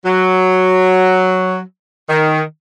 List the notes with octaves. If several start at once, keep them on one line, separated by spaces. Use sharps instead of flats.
F#3
D#3